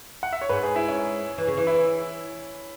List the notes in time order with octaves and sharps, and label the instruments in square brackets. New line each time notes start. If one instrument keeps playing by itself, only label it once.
[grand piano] F#5
E5
C#5
[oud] G#2 [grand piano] B4
[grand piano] G#4
E4
C#4
[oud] E3
C#3
E3
[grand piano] E4